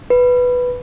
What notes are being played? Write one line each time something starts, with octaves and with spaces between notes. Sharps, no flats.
B4